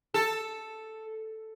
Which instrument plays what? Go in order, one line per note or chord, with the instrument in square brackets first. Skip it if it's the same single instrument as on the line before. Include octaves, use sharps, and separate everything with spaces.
[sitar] A4